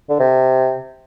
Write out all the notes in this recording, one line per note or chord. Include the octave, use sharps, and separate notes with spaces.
D3
C3